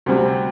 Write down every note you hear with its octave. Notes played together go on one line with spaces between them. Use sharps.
D2 C3 G3 C4